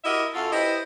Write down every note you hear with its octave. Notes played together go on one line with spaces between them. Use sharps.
E4 F#4 G4 A#4 D#5 E5
F#2 F4 F#4 A4
E4 G4 B4 C5 D#5